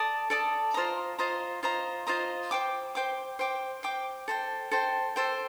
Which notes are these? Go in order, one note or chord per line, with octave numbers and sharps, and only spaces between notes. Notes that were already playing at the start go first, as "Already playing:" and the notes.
Already playing: A4 D5 A5 D#6
A4 D5 A5 D#6
F4 C5 D#5 A#5
F4 C5 D#5 A#5
F4 C5 D#5 A#5
F4 C5 D#5 A#5
C5 G5 D6
C5 G5 D6
C5 G5 D6
C5 G5 D6
A4 C5 G5
A4 C5 G5
A4 C5 G5